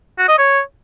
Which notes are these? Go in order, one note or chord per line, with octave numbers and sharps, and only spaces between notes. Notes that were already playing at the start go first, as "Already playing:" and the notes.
F#4
D#5
C#5